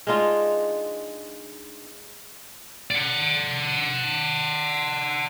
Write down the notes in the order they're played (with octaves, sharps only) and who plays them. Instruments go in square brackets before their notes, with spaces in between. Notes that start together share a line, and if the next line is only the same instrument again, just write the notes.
[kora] G#3 D4 D#4 F4
[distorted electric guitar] D5 F#5